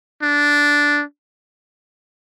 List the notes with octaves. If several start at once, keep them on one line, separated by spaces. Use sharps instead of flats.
D4